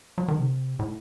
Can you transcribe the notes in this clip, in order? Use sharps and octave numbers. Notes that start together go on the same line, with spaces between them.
F#3
D#3
C3
A2